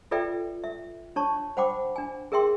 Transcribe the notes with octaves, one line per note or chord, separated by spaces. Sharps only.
F4 A4 B4 D5 E5 G5
E5
D4 C#5 A5 C#6
C5 F#5 G5 B5 D6
D4 G#5
G#4 A#4 E5 G5 C6